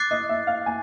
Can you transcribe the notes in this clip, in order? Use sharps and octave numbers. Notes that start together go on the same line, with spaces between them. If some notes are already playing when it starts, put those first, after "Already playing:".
Already playing: D6 F#6 A6 C7
D#5
E5
F5
G#5